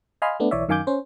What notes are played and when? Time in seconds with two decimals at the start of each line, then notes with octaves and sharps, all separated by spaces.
0.22 D#5 F5 G#5 B5 C6 F6
0.40 A3 B3 D4
0.51 B1 E3 C#5 D5 E5
0.69 F#2 D#3 F5 G#5 D6 G6
0.87 C#4 C5